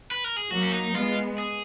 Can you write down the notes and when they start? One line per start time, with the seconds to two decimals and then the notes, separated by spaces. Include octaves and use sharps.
0.11 B4
0.24 A#4
0.37 G#4
0.50 F#3 A#3 F#4
0.63 C#4
0.72 D#4
0.94 G#3 B3 F4
1.38 G#4